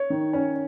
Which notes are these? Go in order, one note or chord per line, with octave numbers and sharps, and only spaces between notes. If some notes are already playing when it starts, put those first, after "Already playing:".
Already playing: C#5
D#3
C#4